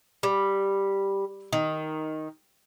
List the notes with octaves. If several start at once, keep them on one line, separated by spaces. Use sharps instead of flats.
G3
D#3